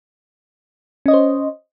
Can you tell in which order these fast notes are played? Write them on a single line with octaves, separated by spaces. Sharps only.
C#4 D#5 C#5 C5